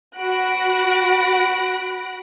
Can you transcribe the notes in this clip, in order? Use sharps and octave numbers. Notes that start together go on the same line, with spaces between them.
F#4 B5 F#6 A#6 D7